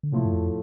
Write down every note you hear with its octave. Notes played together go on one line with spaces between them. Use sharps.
D3
A2 C3 F3 A3 E4
G2
F2